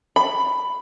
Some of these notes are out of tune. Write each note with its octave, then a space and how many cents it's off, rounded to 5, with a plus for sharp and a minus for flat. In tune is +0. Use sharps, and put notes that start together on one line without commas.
B5 +5